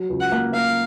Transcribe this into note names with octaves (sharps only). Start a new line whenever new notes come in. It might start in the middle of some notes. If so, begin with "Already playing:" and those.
Already playing: F#3
C#2
F#5
A#3
A#3 F5